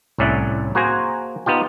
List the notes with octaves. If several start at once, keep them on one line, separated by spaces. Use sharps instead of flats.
C2 A2 C#4 D5 E5 F#5
A#3 F#4 G#4 C5 G#5 A#5
B3 D#4 F4 G4